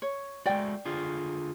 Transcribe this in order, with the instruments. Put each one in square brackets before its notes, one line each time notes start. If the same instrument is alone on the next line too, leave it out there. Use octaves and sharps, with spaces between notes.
[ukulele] C#5
[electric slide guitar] G#3 A3 F#4 [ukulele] D5 G5
[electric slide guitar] D3 F4 G#4